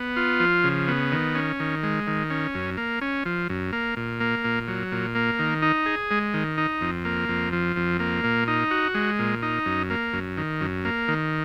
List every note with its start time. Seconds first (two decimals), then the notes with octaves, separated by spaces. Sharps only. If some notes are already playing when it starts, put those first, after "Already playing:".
Already playing: B3
0.16 F4
0.40 F3
0.64 C#3
0.88 B3
1.12 D#3
1.35 C#4
1.60 D#3
1.83 G#3
2.07 D#3
2.30 C#4
2.55 F#2
2.77 A#3
3.01 C#4
3.25 F3
3.49 F#2
3.72 A#3
3.96 A#2
4.20 A#3
4.44 A#2
4.68 F#3
4.92 A#2
5.15 A#3
5.39 D#3
5.62 D#4
5.86 G#4
6.11 G#3
6.34 D#3
6.58 D#4
6.81 F2
7.05 A#3
7.29 F2
7.53 F3
7.76 F2
8.00 A#3
8.24 A#2
8.48 D#4
8.71 F#4
8.95 G#3
9.19 A#2
9.43 D#4
9.66 F#2
9.90 A#3
10.13 F#2
10.37 D#3
10.61 F#2
10.85 A#3
11.08 D#3